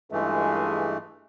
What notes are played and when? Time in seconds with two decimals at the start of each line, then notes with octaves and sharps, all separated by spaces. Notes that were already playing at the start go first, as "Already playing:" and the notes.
0.12 C#2 G2 E3 G#3 A3